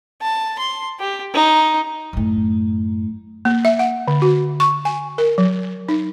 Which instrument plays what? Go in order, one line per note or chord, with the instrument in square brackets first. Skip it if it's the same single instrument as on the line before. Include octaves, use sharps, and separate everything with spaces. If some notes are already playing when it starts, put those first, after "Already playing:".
[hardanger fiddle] A5
C6
G4
D#4
[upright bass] F#2 A2
[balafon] A#3
E5
F#5
D3
F#4
C#6
G#5
A#4
F#3
D#4